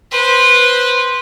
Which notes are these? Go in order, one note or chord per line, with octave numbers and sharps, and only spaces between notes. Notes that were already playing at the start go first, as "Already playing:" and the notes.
B4 C5